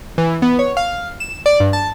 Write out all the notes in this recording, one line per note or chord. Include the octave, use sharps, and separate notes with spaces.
E3
B3
C#5
F5
E7
D5
G2
A5